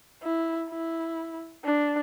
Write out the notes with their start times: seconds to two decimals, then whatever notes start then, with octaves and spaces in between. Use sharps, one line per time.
0.22 E4
0.70 E4
1.65 D4